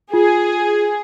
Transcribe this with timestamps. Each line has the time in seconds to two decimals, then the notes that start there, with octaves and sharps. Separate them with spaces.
0.13 F4 G#4